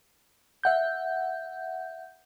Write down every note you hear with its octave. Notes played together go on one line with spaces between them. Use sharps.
E5 F#5 G6